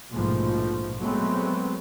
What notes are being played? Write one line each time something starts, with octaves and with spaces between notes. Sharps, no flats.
A#1 G#2 B2 F3 A3
F#3 G#3 A3 B3 C4